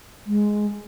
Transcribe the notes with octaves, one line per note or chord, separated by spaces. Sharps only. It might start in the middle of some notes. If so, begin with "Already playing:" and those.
G#3